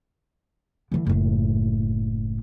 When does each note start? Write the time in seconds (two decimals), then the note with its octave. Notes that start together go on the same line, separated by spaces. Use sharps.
0.92 D3 E3
1.07 F#1 A2